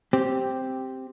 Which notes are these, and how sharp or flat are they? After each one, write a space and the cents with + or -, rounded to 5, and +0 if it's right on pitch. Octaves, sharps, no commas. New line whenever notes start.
C4 +0 G4 +0